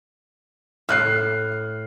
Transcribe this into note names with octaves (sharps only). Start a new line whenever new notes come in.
A2 F6 F#6 C7